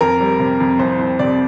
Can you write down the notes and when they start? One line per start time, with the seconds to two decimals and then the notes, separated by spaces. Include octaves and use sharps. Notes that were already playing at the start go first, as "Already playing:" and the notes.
0.01 F2 A#4
0.20 G3
0.40 C3
0.60 F2
0.79 C2 C5
0.99 C2
1.19 C3 D5